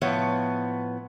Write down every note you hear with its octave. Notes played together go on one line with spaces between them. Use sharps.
A2 F3 B3 C#5